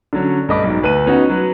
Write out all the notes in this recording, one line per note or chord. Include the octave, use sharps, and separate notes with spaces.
D3 F#3 C#4
G2 A3 D#5 B5 D6
B1 G#2
D2 B4 A5 D#7
B3 C#4 D#4 F#4
F#3 B4